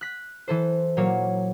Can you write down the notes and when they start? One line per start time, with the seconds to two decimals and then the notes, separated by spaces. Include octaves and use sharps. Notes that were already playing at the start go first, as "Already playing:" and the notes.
0.01 F#6 B6
0.48 E3 A4 C5
0.97 A#2 F#3 A#3 C#5